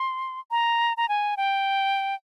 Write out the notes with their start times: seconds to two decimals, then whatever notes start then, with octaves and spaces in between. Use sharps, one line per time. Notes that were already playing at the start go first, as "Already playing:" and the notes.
Already playing: C6
0.51 A#5
0.97 A#5
1.09 G#5
1.37 G5